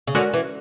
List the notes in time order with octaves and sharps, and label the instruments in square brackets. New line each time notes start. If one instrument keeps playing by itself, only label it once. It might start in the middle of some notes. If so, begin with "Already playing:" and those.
[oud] C#3
[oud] D3 [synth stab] G#3 C#4 F#4 A#4
[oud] E3